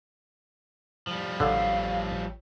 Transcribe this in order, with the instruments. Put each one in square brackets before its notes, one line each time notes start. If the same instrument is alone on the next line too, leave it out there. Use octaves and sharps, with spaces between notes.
[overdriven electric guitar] F3 G3
[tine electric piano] A1 C#5 E6 [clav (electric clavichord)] D3 [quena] F5